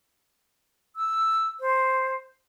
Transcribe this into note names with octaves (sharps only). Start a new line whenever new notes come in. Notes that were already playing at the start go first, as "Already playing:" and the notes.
E6
C5